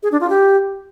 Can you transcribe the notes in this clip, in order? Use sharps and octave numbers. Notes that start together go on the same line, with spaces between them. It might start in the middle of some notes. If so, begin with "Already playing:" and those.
G#4
D4
F4
G4